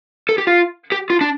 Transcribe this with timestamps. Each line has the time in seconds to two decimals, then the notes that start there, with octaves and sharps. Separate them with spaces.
0.29 A4
0.38 G4
0.47 F4
0.92 G4
1.10 F4
1.21 D4